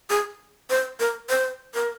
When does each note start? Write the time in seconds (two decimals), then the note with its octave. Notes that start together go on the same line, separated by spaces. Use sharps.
0.10 G#4
0.70 C5
1.00 A#4
1.29 C5
1.75 A#4